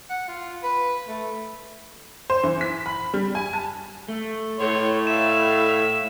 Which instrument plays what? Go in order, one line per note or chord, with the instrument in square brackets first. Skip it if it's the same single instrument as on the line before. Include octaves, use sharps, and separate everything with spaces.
[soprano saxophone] F#5
F4
B4
A3
[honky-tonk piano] C5
E3
B6
B5
G3
G#5
A5
[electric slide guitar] A3
[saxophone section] A2 [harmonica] C#5 C6
[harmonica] E5 F5 [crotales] E7